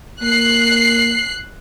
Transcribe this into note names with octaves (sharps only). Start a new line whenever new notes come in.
A#3 F#6 C7